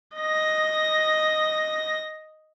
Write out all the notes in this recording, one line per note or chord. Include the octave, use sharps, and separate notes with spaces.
D#5 A#6